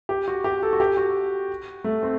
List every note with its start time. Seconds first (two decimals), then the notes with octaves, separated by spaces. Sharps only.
0.09 G4
0.28 F#4
0.44 G4
0.63 A4
0.73 F#4
0.80 G4
0.97 F#4
1.84 A3
2.03 C4